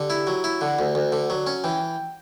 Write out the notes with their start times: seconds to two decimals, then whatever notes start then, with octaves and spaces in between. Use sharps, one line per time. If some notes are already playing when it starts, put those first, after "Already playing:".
Already playing: D3 G4
0.10 E4
0.27 F#3
0.44 E4
0.61 D3 F#5
0.79 D2
0.95 D2
1.12 D3
1.30 F#3
1.47 C#4
1.64 E3 G5